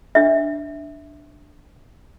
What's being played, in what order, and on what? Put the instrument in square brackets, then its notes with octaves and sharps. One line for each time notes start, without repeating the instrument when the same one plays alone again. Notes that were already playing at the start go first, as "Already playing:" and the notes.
[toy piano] D4 E5